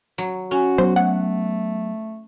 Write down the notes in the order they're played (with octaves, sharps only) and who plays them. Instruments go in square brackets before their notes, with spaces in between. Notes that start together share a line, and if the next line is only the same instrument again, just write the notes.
[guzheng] F#3
[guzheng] C#4 [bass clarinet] F#4
[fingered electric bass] F#3 B3 [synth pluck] C5
[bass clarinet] A3 [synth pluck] F#5